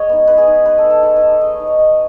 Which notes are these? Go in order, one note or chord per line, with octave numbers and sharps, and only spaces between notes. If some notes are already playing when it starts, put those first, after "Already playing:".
Already playing: G#3 B4 C#5 D#5
B3 D#4
G#3 B4
G#4
D#4
G#3 B4
A4
D#4
A4
G#3 A4
B4
D#4
G#3 D#5
C#5
D#4
C#5
G#3 D#5